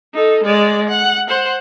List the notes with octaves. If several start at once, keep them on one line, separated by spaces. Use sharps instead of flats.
D#4 A4
G#3 D5
F#5
C5 F#5